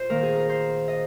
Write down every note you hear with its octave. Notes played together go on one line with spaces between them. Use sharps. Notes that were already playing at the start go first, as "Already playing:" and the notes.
Already playing: A#2 C5
D#3 A#3 A#4
G#4
A#4
C5
D#5